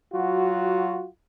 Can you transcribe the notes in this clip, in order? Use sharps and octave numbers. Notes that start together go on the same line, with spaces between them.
F#3 F4 F#4